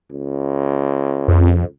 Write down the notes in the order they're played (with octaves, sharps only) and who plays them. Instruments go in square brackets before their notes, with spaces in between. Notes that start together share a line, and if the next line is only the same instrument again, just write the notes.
[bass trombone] C#2
[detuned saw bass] F2